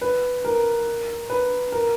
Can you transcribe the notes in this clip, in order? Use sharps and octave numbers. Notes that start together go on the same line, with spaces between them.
B4
A#4
B4
A#4